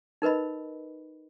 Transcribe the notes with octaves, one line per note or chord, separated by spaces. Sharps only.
D#4 A#4 B4 D#5 B5